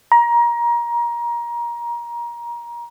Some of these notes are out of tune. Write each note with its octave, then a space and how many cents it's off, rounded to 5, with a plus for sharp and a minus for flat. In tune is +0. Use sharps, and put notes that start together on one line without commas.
A#5 +25